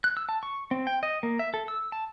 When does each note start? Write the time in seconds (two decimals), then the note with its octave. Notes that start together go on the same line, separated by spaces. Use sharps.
0.04 F#6
0.17 E6
0.29 A5
0.43 C#6
0.71 C4
0.87 G5
1.03 D#5
1.23 A#3
1.39 E5
1.54 A4
1.68 E6
1.92 A5